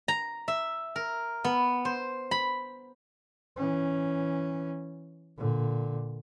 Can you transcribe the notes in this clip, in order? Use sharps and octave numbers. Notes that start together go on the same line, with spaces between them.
A#5
E5
A#4
B3
C5
B5
E3 C#4
A#2 D3